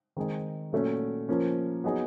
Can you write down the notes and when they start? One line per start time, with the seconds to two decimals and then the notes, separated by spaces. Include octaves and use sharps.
0.17 D#3 G#3 C4 D#4 G#4
0.72 A#2 F#3 A3 C#4
1.29 F3 A#3 C#4
1.84 F#3 B3 D#4 G#4